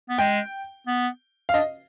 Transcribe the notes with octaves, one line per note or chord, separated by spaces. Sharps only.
B3
G#3 G5
B3
F5
D4 D#5